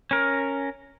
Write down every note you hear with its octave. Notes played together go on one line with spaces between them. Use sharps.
C#4 A#4